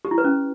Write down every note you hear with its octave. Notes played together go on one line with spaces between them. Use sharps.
G4
E4
B4
C#4